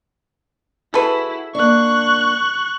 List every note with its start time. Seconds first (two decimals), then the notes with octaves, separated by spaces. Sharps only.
0.94 E4 F#4 G#4 A4 B4
1.55 A#3 D4 C#6 F#6